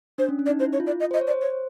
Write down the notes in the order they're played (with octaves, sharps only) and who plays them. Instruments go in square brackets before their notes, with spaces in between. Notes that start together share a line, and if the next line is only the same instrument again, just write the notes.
[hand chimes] D4 [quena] C5
[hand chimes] C#4
C#4
[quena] D5
[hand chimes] D#4
[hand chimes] E4 [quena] C5
[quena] C#5
[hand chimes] F4
[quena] D5
D#5
[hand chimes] C5
[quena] D#5
[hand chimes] C#5
[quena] D5
[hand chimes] C5
[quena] C#5